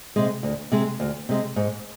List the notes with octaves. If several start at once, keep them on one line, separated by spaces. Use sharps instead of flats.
C3 G#3
D2
C3 G#3
D2
C3 G#3
G#2